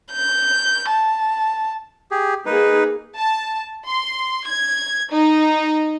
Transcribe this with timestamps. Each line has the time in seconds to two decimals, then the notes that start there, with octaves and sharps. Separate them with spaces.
0.12 G6
0.90 A5
2.11 G4 G#4
2.46 D#3 A#3 D#4 G#4 B4
3.18 A5
3.88 C6
4.47 G#6
5.12 D#4